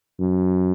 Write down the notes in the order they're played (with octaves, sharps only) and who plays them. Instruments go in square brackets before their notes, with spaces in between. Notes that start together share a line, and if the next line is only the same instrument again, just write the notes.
[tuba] F#2